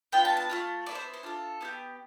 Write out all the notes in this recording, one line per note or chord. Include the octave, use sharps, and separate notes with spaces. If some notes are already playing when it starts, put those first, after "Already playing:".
B3 D4 F4 G5
A5
A5
A3 C4 F4
B3 E4 A4 D5
C5
C5
D4 F4 A4
B3 E4 G4